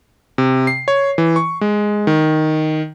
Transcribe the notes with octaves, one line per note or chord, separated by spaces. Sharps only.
C3
C7
C#5
E3
C#6
G#3
D#3